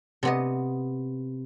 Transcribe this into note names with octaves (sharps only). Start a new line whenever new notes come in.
C3 B3 D#5